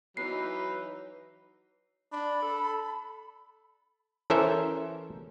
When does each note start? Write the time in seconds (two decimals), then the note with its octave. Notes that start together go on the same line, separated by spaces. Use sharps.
0.17 E3 F#3 D#4 B4 C7
2.12 D4 B5
2.42 A4
4.30 E3 C#4 A4 A#4 C5 E5